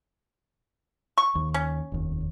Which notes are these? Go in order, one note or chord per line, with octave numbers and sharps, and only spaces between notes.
C#6
D#2
C#4
F1 D#2